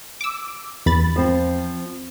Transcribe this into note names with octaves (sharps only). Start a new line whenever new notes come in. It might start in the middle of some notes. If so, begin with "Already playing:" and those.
D6 E6
E2 B5 A6
F3 C4